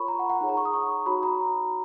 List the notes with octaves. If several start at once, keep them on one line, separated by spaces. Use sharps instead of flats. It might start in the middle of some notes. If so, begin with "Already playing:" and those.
Already playing: F4 A#4 C#5 B5 C#6
A#5
F#5
F#5
D#4 G#4 C#5
A#5
C#6
D#6
C#6
D#4 F#4 C#5 B5
A#5